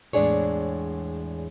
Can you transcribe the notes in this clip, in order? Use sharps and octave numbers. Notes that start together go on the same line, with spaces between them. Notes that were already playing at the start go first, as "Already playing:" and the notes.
E2 A2 G#3 D4 G#4 C#5